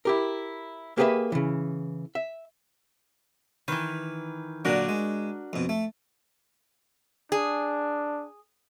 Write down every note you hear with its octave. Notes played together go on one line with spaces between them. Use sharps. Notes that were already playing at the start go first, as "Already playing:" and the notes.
E4 G4 A#4
A#3 G4 G#4 A#4 B4 E5
C#3 E3
E5
D#3 E3 B4
A#2 D3 F#3 D4 F#4 A#4
G#3
F2 B2
A3
D4 G#4